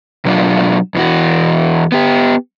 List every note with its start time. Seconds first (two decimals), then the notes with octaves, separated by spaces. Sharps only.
0.25 B2 F#3 D4 F4
0.95 E2 E3 F#4
1.92 B3 G4